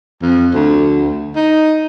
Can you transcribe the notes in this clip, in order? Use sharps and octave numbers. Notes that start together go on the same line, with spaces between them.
F2
D2
D#4